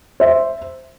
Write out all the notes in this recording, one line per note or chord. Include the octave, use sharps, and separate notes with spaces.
C5 E5